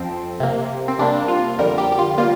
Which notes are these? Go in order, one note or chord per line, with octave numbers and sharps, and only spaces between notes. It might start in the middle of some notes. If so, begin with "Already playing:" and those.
Already playing: F2 F3 C4
C3 A#3
C4
C3 G3 A#3 D4
F4
F2 D3 G3 A#4
G4
G4
F4
G3 A#3 F4